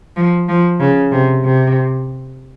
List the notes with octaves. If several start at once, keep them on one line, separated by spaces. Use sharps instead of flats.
F3
F3
C#3
C3
C3